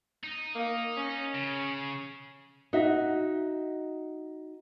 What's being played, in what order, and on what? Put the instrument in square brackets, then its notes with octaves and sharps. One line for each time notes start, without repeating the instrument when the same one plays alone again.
[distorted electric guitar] D#4
[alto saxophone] A#3
C#4
[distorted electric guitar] C#3
[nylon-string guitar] D#4 F#4 E5